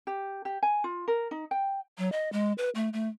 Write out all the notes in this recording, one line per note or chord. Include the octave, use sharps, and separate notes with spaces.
G4
G4
G#5
F4
A#4
D#4
G5
F#3
D#5
G#3
B4
A3
A3